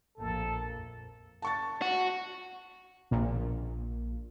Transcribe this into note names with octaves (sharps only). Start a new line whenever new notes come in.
A#1 F2 A#3 A4
A5 C#6 A6
F#4
A#1 A#2